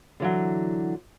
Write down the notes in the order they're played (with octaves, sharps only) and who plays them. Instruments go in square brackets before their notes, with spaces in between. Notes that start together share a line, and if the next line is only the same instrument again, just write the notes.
[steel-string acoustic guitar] D3 E3 F#3